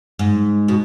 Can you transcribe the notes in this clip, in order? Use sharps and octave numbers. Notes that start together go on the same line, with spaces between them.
G#2
B2